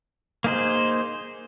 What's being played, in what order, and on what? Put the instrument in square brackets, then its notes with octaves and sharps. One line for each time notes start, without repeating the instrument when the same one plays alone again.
[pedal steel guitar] A#3 D#4 G#4 C5